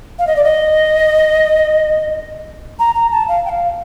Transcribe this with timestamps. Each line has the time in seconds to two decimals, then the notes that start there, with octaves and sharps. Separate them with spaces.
0.18 F5
0.26 D#5
0.36 D5
0.44 D#5
2.79 A#5
2.95 A#5
3.11 A5
3.28 F5
3.45 G5
3.49 F5